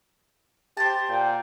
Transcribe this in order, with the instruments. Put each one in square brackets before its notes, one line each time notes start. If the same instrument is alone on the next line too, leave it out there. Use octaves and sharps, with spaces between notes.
[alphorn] G4 [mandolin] C5 A5
[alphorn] A#2 [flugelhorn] G5